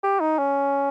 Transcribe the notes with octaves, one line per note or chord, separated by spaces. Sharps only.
G4
D#4
C#4